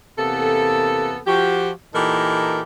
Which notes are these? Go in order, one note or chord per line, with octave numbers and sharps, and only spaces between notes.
E2 C3 A#3 B3 A4
F3 F#4 G4
A#2 E3 D#4 G4 A4 A#4